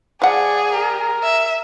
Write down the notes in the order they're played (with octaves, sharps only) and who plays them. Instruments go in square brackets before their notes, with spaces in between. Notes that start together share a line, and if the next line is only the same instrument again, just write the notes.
[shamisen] F3 F#5 [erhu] G#4 [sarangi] D5
[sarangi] A#4
[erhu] E5